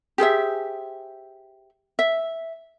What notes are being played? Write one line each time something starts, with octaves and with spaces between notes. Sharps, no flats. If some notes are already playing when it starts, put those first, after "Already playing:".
G4 G#4 C5 E5
E5